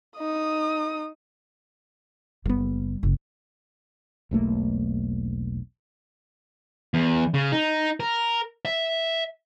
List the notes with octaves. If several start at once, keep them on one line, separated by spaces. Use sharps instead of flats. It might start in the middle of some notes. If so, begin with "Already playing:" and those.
D#4 D#6
F#1 G3 B3
F#1 C#3
E1 B1 A3 A#3
E2
C#3
D#4
A#4
E5